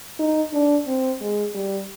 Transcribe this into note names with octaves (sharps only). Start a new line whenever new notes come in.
D#4
D4
C4
G#3
G3